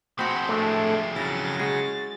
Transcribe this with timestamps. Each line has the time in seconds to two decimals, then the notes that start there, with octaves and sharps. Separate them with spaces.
0.19 F2 G#3 C4 F#4 C5 B5
0.49 A2 A3 D4
1.16 C#3 F#3 E4 A6 A#6
1.59 G#3 F#4